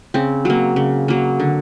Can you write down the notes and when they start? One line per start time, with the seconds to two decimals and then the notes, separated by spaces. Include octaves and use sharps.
0.14 C#3 C4
0.45 F#3 A#3
0.76 C#3
1.08 F#3 A#3
1.40 D3